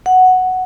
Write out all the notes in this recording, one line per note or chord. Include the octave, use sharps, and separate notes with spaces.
F#5